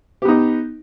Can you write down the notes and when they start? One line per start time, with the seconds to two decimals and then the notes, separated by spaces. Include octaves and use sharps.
0.22 G4
0.25 B3
0.28 D#4